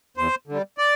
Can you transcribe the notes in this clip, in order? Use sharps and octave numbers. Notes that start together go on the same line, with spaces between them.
E2 C5
D3 G3
D5